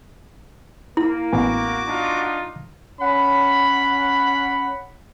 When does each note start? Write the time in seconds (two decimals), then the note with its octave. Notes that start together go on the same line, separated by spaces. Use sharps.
0.97 A#3 E4
1.32 A1 B3 F#4 G#5 D6
1.85 D4 D#4 F4
2.99 C#4 F#5 B5